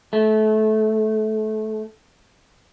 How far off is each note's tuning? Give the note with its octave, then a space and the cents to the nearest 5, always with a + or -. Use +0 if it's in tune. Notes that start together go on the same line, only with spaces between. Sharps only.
A3 -25